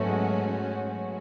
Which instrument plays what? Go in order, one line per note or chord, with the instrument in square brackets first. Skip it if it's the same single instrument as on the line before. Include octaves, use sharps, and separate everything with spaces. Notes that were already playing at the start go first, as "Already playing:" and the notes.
Already playing: [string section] G#2 F#3 C#4 F#4 [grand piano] A3 B3
[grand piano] G#3
[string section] F#3 C#4 F#4